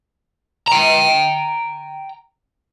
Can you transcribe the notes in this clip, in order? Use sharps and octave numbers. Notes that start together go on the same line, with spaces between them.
G5 A#5